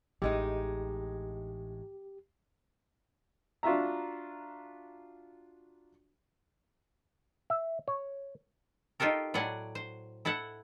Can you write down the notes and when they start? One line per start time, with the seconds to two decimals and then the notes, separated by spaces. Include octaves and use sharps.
0.22 A1 A2 G#3 D#4 G4
3.63 D4 F4 F#4 E5 A#5
7.50 E5
7.88 C#5
9.00 D#4 F4 G4 A4 A#4
9.34 A2 F#3 D5 F#5 G#5
9.75 C5
10.25 E4 A4 E5 F#5